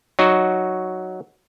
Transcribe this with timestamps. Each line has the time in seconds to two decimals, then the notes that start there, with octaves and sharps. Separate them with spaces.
0.19 F#3 D#4 F#4